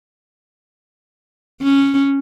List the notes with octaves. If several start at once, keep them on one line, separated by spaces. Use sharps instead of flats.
C#4